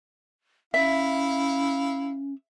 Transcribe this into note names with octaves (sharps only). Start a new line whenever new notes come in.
C#4 E4 E5 F5